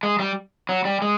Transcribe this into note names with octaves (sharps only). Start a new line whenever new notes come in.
G#3
G3
F#3
G3
G#3